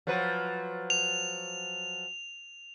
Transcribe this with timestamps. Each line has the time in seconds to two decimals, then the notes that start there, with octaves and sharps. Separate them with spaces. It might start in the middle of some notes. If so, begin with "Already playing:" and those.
0.07 F3 F#3 B4
0.90 F7